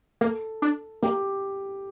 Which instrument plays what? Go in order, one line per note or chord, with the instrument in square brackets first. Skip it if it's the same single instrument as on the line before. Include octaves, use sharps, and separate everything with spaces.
[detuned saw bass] A#3 [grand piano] A4
[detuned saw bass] D4
[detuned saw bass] A#3 [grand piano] G4